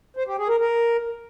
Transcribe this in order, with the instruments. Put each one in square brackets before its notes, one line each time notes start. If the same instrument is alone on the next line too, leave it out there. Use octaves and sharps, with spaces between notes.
[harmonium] C5
G4
G#4
A#4
A#4